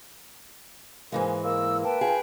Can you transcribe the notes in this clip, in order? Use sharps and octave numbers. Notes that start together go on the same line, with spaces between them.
G#2 E3 G#3 A#3
A#3 E6
B4 G5 A5
F4 G#4